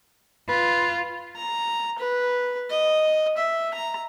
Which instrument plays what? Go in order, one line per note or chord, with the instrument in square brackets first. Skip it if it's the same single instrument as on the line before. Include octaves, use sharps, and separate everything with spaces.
[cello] F4 [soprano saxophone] B4
[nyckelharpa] A#5
B4
D#5
E5
A#5